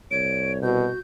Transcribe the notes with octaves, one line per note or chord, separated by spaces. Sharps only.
C2 C#5 D7
B2 F#4 G6